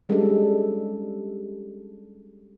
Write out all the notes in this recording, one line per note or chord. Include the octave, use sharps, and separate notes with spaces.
G3 G#3 C#4 D4 G4 A4